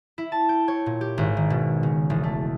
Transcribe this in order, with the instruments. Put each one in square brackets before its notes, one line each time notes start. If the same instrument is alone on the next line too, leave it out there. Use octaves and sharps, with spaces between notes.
[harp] E4
A5
G5
C#5
A#2
G4
G#1
D#3
B2
C#3
E1
A3